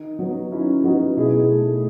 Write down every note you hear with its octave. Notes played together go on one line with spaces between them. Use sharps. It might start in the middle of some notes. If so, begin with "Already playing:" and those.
Already playing: D#3 D#4
F#3 B3
D#3 C#4 E4
F#3 B3 D#4 F#4
B2 E4 G#4
A3